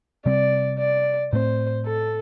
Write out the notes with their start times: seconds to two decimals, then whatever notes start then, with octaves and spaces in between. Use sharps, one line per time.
0.26 C3 G3 C4 D5
0.79 D5
1.33 A2 A3 C4 C5
1.86 A4